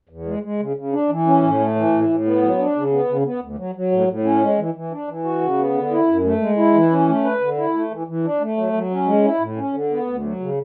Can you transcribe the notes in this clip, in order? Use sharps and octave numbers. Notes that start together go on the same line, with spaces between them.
E2
G#3
G#3
C#3
C#3
D4
E3
C#4
A2
A3
E3
A2
A2
B3
F#3
D4
C#3
B3
C#3
B3
D2
F#3
F#3
A2
A2
C#4
G#3
E3
E3
D4
E3
F#4
C#3
B3
D3
E4
F#2
A3
G#3
E4
E3
C#4
A3
B4
D3
E4
A3
E3
E3
D4
A3
F#3
F#3
C#4
G#3
E4
A2
C#4
D3
B3
D2
F#3
C#3